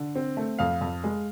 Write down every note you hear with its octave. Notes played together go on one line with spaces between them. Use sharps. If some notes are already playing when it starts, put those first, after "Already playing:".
Already playing: D3
C4
A3
F2 F5
F2
G#3